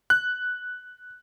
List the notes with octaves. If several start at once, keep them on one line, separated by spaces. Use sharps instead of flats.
F#6